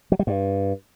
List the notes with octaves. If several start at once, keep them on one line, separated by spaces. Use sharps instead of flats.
F#3
G3
G2